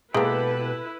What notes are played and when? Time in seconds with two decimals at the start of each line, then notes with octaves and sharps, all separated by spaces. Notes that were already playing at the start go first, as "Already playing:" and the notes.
0.14 B2 G#3 A#3 E4 G4 A4 B4
0.58 E4